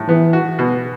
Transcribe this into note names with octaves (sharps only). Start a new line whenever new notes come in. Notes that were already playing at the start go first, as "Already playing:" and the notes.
Already playing: A2
E3 B3
F#4
B2